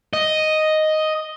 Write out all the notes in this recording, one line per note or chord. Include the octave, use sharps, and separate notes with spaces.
D#5